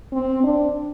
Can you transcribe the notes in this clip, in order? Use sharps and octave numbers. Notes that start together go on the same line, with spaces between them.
C4
D4